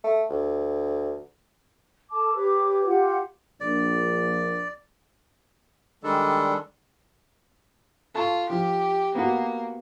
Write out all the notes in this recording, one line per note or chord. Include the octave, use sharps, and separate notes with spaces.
A3
D2
A4 A5 D6
G4 B4 C#5 D6
F4 G4 F#5
A#1 D5
D#3 G3 G#3 D4 A4
F4 A4 A5 C#6
F3 G4
A#3 B3 F#4